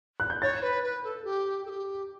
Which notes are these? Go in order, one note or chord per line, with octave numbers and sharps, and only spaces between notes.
F#6
G6
C#5 A6
B4
B4
A4
G4
A4
G4